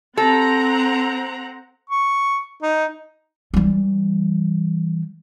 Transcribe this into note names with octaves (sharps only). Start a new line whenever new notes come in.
C4 A4 F#5 A#5
C#6
D#4
E3 G3